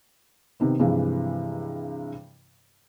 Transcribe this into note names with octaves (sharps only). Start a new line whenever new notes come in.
C3 D#3 B3
G2 C3 E3 F3 G#3